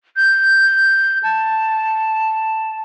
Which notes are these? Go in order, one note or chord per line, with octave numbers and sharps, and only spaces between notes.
G6
A5